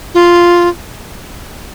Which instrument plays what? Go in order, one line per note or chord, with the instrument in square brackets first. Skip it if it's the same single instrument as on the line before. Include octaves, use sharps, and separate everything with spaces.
[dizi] F4